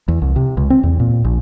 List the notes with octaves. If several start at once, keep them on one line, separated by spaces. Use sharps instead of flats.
E2
C2
C3
C#2
C4
E2
A#2
A#1